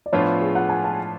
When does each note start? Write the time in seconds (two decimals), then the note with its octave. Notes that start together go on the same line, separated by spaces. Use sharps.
0.06 D5
0.13 A2 F3 B3 D4 F4 C#5
0.41 G#4
0.55 F#5
0.69 G#5
0.84 A5